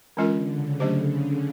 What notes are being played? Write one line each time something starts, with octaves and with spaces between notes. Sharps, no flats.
D3 E3 G#3 C#4 F4 A#4
C#3
C#3 F#3 A3 D4 G4 C5